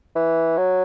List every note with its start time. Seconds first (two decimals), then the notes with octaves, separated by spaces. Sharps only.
0.15 E3
0.57 F#3